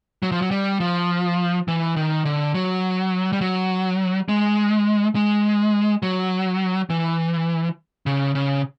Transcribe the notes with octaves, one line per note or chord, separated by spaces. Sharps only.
F#3
F3
F#3
G3
F3
E3
D#3
D3
F#3
G3
F#3
G#3
G#3
F#3
E3
C#3
C#3